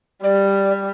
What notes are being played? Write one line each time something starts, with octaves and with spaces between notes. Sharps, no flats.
G3 D5